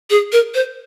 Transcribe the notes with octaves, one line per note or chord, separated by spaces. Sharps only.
G#4
A#4
C5